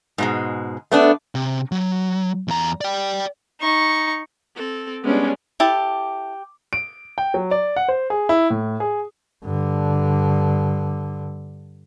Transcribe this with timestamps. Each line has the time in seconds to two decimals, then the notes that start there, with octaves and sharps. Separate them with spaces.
0.18 G#2 B2 G#3
0.92 A3 B3 D4
1.35 C3
1.72 F#3
2.48 E2 A#5
2.81 D5 G5
3.61 D#4 C#6
4.55 C4 A4
5.03 G3 G#3 B3 C#4 D4
5.60 E4 G4 A4 A5
6.73 D7
7.18 G5
7.34 F#3
7.51 D5
7.76 F#5
7.88 C5
8.10 G#4
8.29 E4
8.50 A2
8.80 G#4
9.44 G2 D3